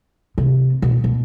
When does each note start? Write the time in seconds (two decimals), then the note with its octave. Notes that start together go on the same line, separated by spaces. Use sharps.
0.38 C3
0.82 B2
1.04 B2